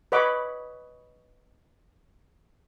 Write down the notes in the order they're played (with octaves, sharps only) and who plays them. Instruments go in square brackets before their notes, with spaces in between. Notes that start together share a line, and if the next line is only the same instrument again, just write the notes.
[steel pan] B4 C#5 D#5 F#5 B5 D6